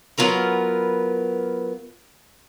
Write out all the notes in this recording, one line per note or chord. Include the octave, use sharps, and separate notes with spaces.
F#3 B3 F4 A#4 B4